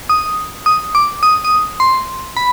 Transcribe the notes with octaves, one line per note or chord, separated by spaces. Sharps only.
D#6
D#6
D6
D#6
D#6
C6
B5